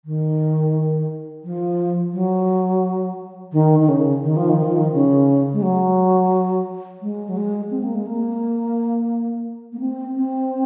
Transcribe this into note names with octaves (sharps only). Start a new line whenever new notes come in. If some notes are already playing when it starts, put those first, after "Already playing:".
D#3
F3
F#3
D#3
D#3
C#3
D#3
F3
D#3
F3
D#3
C#3
G#3
F#3
G#3
F#3
G#3
C4
A#3
G#3
A#3
A#3
C4
C4